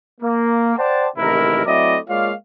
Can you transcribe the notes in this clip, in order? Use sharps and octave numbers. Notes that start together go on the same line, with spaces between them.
A#3
C5 D5 F#5 G5 A5
A1 G#2 C3 D#3 E4 A#4
F#3 A3 C4 E4 D5 D#5
G#3 A#3 F4 C#5 D5 F5